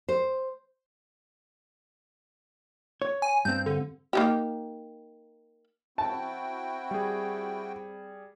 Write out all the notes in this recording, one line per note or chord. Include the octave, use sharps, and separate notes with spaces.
C5
C#5
G#5
G2 C4 G6
D3
A#3 D#4 G4
C4 E4 F#4 G5 A5
G3 G#4